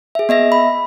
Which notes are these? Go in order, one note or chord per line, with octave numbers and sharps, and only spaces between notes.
G#4 E5
B3 D#5 E5 A#6
B5